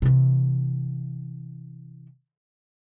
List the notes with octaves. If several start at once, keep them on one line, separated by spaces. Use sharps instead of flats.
C3 E3